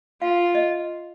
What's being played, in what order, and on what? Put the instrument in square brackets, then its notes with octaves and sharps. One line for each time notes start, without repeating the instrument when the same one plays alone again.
[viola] F4 [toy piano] F5
[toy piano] D#5